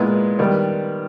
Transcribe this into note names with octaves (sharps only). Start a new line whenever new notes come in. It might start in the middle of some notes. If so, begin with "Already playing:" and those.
Already playing: A#2 G#3 B3 E4
D#3 G3 B3